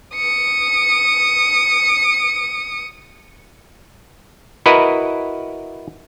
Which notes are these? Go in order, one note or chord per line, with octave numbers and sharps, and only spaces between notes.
D#6 C#7
E4 F#4 A#4 B4 D#5